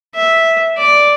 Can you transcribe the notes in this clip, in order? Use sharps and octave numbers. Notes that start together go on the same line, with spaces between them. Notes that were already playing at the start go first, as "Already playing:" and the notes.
E5
D5